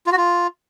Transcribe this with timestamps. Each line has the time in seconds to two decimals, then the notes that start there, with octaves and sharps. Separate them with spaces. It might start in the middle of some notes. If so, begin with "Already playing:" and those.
0.06 F4
0.12 F#4
0.17 F4